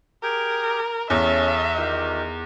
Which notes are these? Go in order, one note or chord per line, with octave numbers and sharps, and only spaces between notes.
G4 G#4 A#4 D6
E2 C#4 A4 E5 F5
D#3 D#4 F4 G4